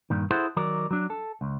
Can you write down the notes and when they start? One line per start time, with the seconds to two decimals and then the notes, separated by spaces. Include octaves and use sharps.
0.10 G2 A#2 D#3
0.31 E4 G#4 A4 C5 E5 F#5
0.56 D#3 F#3 A#4 D5
0.91 F#3 D4
1.10 A4
1.41 C#2